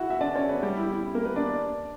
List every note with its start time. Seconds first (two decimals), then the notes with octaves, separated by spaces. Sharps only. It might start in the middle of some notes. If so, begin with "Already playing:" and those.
Already playing: E4 F#4 E5 F#5
0.10 E5
0.21 D4 D5
0.35 C#4 C#5
0.49 B3 B4
0.63 G3 G4
0.77 E4
0.91 E4
1.15 A#3 A#4
1.25 B3 B4
1.36 D4 D5